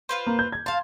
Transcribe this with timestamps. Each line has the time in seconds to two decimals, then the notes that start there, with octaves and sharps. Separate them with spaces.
0.09 F4 B4 C5
0.27 A#3
0.39 G6
0.52 G#6
0.66 F5 A5 C6